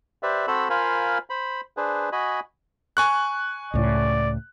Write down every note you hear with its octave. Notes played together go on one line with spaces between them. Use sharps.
G4 B4 C5 D5 E5
C4 F#4 A4 C5 B5 E6
F4 A#4 C5 F5 G#5 B5
C5 B5
D4 G#4 B4 C5
F#4 D#5 G#5 B5
G#5 C#6 F#6
C#2 A2 D5